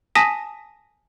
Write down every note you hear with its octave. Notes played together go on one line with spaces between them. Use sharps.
G#5 A5 D#6 A#6 B6